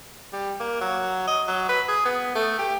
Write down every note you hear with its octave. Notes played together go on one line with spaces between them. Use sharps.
G3
A#3
F#3
D#5
F#3
B4
G#4
B3
A3
G4